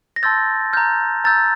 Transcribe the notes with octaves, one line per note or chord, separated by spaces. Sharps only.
A#6
A5 C6 E6 G6 A6
A#5 F6 G6
A#5 E6 G6 A6